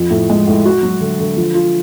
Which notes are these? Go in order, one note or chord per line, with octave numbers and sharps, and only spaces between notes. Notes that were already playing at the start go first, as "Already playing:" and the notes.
Already playing: F2 F3
A2
G#3
A2
F#4
F#3
D3
D3
F3
F4